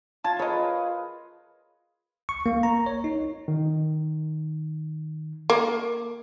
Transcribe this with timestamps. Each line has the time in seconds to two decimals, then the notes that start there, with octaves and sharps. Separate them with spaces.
0.24 F4 G#5 A5
0.39 G#4 A#4 B4 C#5 D#5
2.29 C#6
2.46 A#3
2.63 A#5
2.86 C#5
3.04 D#4
3.48 D#3
5.50 A#3